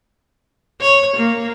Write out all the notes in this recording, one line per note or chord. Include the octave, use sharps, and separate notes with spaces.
C#5
A#3